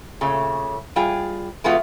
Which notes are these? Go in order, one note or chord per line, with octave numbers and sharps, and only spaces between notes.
A#2 C#3 A3
G3 F4 G#4 G5
E3 G#3 A3 B3 F4 F#4